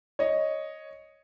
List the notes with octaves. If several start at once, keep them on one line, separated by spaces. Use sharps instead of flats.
C#5 D#5